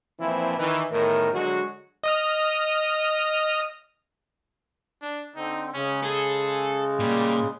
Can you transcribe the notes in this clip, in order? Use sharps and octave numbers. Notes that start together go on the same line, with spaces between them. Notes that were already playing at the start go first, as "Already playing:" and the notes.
A#2 E3 F3 C4 E4
D#3 E3
E2 A2 D#3 A#4
D3 F#3 G#3 F#4
D#5 D#6 F6
D4
D3 C4 D#4
C#3 G#3 C#4
G#4 A4
A#2 G3